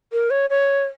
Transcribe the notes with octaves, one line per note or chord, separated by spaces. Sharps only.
A#4
C#5
C#5